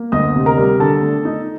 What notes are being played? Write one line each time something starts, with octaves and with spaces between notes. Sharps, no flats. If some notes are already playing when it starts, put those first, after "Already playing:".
Already playing: A#3
D2 D#5 D#6
C3
A#4 A#5
G3
D3 A4 A5
A3
D#4